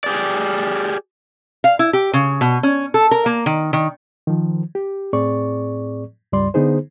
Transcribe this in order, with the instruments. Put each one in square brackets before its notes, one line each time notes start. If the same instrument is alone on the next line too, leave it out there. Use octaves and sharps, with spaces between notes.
[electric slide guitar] G4 G#4 D5
[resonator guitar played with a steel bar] F5
E4
G4
C#3
B2
C#4
A4
A#4
A#3
D#3
D#3
[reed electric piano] D#3 F3
G4
A2 C4 G#4 D5 C#6
C#2 G2 G3 D5 C6
D3 B3 D#4 G#4 C5